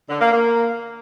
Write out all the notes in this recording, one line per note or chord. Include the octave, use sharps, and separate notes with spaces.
D3
A#3
A#3